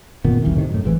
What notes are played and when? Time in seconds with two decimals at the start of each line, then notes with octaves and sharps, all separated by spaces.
0.24 F#1 A#2 D#3 B3
0.43 F#1 C2 D#3 E3
0.56 A2 C3 D#3
0.70 F#2 A2
0.84 G#1 G#2 E3